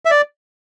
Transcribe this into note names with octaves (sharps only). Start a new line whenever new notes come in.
E5
D5